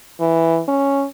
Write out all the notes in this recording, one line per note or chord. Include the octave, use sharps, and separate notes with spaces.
E3
C#4